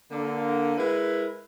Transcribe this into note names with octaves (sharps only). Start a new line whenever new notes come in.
D3 A#3
G#3 E4 A#4 B4